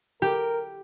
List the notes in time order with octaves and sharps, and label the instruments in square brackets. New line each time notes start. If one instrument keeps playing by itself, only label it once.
[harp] G4 [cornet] A#4